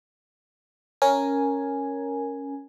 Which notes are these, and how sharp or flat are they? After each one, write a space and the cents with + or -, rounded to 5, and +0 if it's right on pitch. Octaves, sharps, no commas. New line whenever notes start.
C#4 +0 A#4 +0 G#5 +0